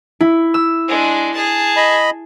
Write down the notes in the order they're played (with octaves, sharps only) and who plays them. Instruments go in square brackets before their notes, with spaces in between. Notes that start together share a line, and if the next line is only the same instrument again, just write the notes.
[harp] E4
E6
[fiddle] G#3 D4
G#4 A5
[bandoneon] D#5 B5